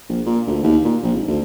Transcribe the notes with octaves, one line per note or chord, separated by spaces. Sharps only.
A#1
A#2
D2
D#2
A#2
A#1
G#1
D2